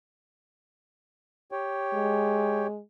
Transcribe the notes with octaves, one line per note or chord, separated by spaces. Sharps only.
G4 C#5 G5
G#3